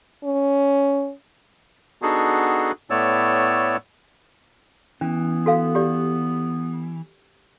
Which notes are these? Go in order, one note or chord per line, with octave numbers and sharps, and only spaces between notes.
C#4
B3 D4 D#4 F#4 G#4 A4
A2 A3 B3 C#5 D5 E6
E3 B3 C#4
F#4 A4 F5
G4 D5